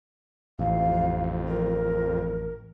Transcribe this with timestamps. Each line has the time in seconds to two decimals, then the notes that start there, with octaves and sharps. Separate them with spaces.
0.59 A1 F2 F5
1.47 A#4